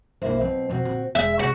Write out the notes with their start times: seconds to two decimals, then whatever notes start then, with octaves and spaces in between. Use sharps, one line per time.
0.22 B1 D3 A#3 E4 C5
0.41 B2 F#3 C4
0.69 F2 B2 C4 F#4
0.85 A#2 D3
1.15 E1 G#3 E5
1.39 C3 C#4 F#4